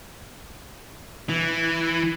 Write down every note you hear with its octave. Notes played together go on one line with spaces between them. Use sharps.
E3